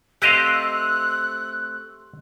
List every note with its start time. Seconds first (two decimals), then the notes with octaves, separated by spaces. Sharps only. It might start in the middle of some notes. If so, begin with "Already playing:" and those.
0.22 A3 C4 G4 D#5 F5 F#6